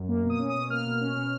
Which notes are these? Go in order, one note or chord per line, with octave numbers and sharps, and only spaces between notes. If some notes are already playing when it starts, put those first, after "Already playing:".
Already playing: F#2
A#3
B2
D#6
C#4
D#6
B2
A#3 F6
B2
C#4
B2